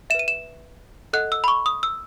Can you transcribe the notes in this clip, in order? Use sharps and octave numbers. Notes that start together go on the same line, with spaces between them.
B4 E5 D#7 E7
E7
A4 D#5 F#5 F#6
E6
B5
C#6
D#6
E6